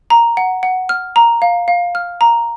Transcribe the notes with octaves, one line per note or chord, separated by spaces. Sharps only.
A#5
F#5
F#5
F6
A#5
F5
F5
F6
A#5